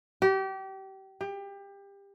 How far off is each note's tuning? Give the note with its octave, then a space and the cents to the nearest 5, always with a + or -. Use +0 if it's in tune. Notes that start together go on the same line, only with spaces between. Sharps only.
G4 -30
G4 +25